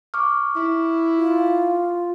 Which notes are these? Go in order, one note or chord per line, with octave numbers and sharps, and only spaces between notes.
C#6 D6 F6
E4
F4